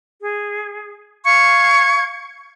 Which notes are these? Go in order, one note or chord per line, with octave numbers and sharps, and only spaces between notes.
G#4
F5 C#6 G#6